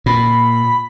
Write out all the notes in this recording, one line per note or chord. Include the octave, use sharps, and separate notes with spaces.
A#2 B5